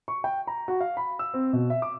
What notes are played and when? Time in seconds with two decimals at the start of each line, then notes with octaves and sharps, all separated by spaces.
0.08 C#6
0.24 G5
0.47 A#5
0.68 F#4
0.81 F5
0.97 B5
1.19 E6
1.34 C4
1.53 B2
1.70 E5
1.82 D6